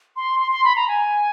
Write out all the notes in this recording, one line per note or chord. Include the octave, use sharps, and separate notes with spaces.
C6
C6
C6
B5
A#5
G#5